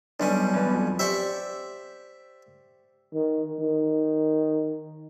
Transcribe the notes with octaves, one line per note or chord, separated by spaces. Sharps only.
B1 G3 C#4 D4
E2 B4
F2
G4 C5 D5 E5 C#6
D#3
D#3